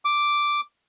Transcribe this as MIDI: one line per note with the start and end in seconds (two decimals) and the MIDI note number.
0.05 0.61 86